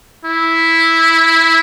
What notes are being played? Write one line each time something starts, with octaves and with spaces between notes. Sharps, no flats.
E4